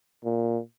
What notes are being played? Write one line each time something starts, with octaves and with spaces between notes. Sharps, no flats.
A#2